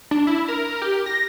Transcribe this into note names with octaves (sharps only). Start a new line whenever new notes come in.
D4
E4
A#4
G4
A#6